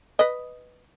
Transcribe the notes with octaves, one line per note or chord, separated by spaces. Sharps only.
B4 D#5